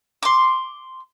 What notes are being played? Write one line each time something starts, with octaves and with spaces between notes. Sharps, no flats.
C6 D6